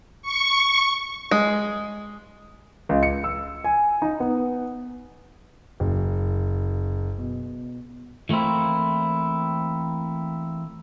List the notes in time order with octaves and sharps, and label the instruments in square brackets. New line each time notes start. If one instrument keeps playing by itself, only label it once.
[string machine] C#6
[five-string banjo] G#3
[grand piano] C#2
C#7
E6
G#5
D#4
B3
F#1
B2
[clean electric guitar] E3 A3 A#3 C4 E4